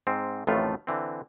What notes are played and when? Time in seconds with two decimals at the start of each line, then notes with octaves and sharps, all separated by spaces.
0.07 G#2 C4
0.47 A1 F2 A2 D#3 A3 F4
0.87 D3 E3 C4